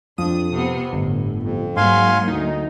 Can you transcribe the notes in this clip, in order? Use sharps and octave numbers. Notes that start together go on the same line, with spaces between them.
F2 D4 D#6
C3 B3
G1 A2
F2
G#2 F#3 A#3 F5 G#5 C6
D2 D#4